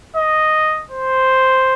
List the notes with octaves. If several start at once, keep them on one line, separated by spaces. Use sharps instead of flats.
D#5
C5